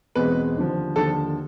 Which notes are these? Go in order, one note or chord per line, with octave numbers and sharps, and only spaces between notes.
E2 B2 G#3 C4 B4
D#2 D3 F3
D#2 D3 F3 A4